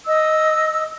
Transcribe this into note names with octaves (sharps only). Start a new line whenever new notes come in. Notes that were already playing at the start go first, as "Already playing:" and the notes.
D#5 E6